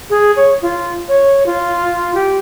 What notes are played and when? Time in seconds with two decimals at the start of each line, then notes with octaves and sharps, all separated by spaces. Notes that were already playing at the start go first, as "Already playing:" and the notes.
0.10 G#4
0.36 C#5
0.62 F4
1.08 C#5
1.46 F4
2.14 G4